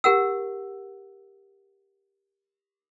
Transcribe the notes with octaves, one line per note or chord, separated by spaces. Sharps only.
G4 A#4 F#5 E6